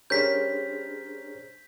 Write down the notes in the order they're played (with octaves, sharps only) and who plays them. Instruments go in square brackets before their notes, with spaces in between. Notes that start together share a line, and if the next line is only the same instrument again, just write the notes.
[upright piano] G3 C#4 A#4 [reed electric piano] D4 G#4 C5 [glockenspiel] G6 B6